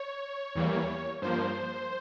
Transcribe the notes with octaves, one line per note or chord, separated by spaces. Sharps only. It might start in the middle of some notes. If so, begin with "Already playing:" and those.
Already playing: C#5
E2 E3 G3 A#3
G2 F3 A#3 C5